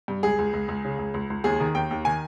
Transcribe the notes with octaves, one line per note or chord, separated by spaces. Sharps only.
G2
C#2 G#4
C#2
C#2
C#2
C#3
C#2
C#2
C#2
D#2 G#4
D#3
D#2 G5
D#2
D#3 G#5